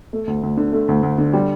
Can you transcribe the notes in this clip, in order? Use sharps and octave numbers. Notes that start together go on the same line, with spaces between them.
A3
D2
D2
D3
A3
D2
D2
D3
G3